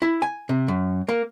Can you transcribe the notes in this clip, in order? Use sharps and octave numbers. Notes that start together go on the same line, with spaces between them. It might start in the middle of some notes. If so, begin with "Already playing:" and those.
E4
G#5
C3
F#2
A#3